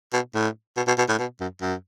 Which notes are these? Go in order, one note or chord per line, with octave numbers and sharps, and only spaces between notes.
B2
A2
B2
B2
B2
A2
B2
F#2
F#2